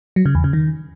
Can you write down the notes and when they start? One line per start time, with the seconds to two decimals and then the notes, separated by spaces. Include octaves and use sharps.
0.16 F#3
0.26 C#3
0.35 E2
0.44 C#3
0.53 D#3